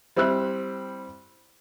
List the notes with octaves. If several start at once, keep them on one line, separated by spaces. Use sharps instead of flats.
G3 C4 E4 E6 F#6